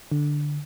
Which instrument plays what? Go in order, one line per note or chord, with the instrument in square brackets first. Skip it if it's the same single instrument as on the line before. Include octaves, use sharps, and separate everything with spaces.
[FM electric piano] D3